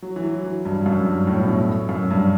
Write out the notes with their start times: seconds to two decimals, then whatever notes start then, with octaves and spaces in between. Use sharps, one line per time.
0.02 F#3
0.16 E3
0.23 F#3
0.44 E3
0.65 G2
0.86 F#2
1.06 G2
1.27 A2
1.41 B2
1.48 A2
1.89 F#2
2.11 G2